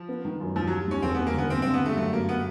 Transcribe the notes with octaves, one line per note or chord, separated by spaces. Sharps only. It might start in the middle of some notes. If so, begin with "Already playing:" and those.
Already playing: F3
B3
D#3
F#2
D#2 F3
F#3
G3
D#2 C#4
E1 C4
B3
D#2
A#3
D3 B3
G2 C4
C4
D3
B3
G2 A3
F#2 A3
F#3 A#3
B3